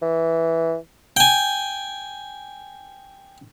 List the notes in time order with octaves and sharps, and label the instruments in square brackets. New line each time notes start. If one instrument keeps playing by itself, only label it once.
[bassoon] E3
[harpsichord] G5 G#5